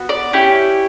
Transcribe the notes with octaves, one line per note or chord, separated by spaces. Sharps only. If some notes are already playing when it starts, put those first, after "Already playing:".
Already playing: B3 F#4
D5
C#4 E4 G4